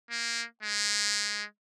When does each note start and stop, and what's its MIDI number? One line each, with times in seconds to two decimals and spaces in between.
0.11 0.45 58
0.63 1.44 56